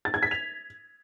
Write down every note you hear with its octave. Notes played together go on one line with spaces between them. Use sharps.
A6
G#6
B6
F7